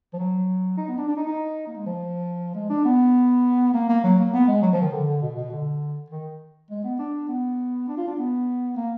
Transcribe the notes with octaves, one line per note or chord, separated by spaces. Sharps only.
F3
F#3
D#4
B3
D4
D4
D#4
D#4
A#3
G#3
F3
G#3
D4
B3
A#3
A#3
F#3
A#3
B3
G#3
F#3
F3
D#3
D3
D3
B2
B2
D3
D#3
G#3
B3
D4
B3
D4
F4
D4
B3
A#3